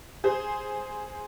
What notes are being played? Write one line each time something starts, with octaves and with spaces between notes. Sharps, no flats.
G#4 C5